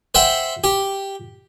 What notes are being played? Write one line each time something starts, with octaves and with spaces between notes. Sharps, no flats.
C5 E5 F#5 G5
G4